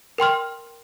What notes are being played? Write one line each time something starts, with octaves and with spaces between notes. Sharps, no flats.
A#4 G5 C6 F6